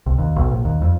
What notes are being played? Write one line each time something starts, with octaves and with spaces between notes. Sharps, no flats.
C2
D#2
B1
A#1
D#2
F2